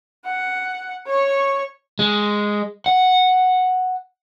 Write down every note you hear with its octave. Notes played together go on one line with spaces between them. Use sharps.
F#5
C#5 C#6
G#3
F#5